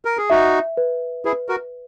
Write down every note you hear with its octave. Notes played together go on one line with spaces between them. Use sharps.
A#4
G#4
D#4 F#4 E5
B4
E4 G#4 B4
F#4 A#4